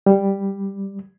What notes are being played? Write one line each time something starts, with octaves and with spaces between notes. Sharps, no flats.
G3